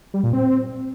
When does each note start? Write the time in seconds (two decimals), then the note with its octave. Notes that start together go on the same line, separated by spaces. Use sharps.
0.14 G3
0.23 A#2
0.33 C4